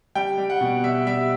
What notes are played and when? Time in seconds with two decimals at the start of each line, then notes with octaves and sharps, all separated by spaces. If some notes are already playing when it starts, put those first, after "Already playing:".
0.15 G3 G5
0.38 G3
0.50 F#5
0.61 B2
0.83 G3 E5
1.06 G3 E5